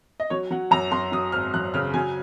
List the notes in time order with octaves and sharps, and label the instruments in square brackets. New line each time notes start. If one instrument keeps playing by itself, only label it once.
[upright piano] D#5
F#3 C#5
F#3 F#5
F#2 A#5
F#2 C6
F#3 D#6
G#1 F6
F#2 F#6
C#3 F6
F#3 G#5